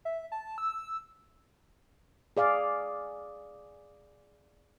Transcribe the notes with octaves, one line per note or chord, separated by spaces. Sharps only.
E5
A5
E6
G#4 D5 F5